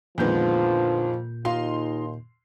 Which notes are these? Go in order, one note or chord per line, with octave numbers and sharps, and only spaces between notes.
F2 A#2 D3 D#3 F3 G#3 B3 G6
D#2 D#4 F4 F5 C6